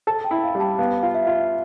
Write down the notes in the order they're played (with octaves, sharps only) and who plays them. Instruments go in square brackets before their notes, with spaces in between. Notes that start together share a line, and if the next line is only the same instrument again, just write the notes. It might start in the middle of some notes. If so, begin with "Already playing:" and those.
[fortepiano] A4 [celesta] A5
[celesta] G5
[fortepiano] E4
[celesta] F5
[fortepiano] G3
[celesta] A5
[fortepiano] B3 [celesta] F5
[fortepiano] F4
[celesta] E5
[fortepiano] F4